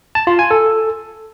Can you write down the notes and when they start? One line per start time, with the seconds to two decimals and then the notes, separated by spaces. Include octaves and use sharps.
0.15 A5
0.27 F4
0.39 G#5
0.51 A4